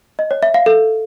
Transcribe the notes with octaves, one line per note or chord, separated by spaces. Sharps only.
D#5
C#5
E5
F5
A4